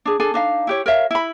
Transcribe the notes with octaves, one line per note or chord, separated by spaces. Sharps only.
D4 G#4
D4 G#4 A4 G#5
D4 D#4 F5
E4 G4 C#5
A#4 C#5 E5 F5
E4 B5